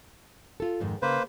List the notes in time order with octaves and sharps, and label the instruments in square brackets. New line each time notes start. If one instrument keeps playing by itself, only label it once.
[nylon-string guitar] F4 A4
F2 G#2 D#3
[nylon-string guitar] C#3 [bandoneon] A#3 B4 C5